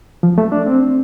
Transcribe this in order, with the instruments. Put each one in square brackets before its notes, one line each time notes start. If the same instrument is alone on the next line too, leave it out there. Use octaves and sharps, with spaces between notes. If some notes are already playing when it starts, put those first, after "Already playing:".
[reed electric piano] F3
A3
D4
C4